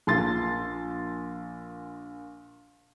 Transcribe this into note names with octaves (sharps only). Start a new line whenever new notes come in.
A#1 C6 A6